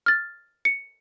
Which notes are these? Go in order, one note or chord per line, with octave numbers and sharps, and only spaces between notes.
F6 A6
C#7